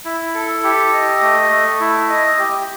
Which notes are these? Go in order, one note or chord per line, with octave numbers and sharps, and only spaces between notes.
E4
A4
G4
D#5
A3
A3
E4
D#5
G4